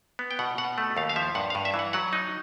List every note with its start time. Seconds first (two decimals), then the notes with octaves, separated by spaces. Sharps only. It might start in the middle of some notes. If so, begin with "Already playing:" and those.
0.19 B3
0.31 G5
0.39 B2 F#5
0.58 B2 F#5
0.78 A3
0.97 D#2 F5
1.09 F5
1.16 F3 E5
1.35 G2 F#5
1.50 F5
1.55 G2
1.65 E5
1.74 E3
1.79 F#5
1.93 F#3 F#5
2.13 D#4